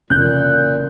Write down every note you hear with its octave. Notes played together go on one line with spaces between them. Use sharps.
F1 A#2 C#3 E3 C#4 F#6 G6